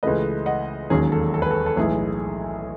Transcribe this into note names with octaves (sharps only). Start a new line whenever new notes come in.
C#2 C#3 E3 A3 B4 D#5
D#5 F#5
E1 D#2 D#3 F#3 C#4 G#4
A4
A4
B4
A4
A4
B1 A2 E3 G#3 G#4